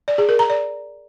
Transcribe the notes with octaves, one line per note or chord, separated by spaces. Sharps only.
D5
G#4
A#4
A#5
D5